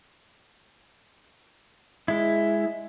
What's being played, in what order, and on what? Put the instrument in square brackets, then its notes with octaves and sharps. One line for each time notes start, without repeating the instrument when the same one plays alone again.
[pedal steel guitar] G#3 E4